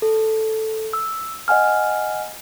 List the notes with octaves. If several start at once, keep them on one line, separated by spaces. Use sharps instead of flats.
A4
E6
D#5 F#5 G#5 F6